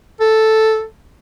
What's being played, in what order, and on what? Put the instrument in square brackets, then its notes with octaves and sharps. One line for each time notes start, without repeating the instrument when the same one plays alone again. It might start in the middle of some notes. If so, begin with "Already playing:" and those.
[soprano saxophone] A4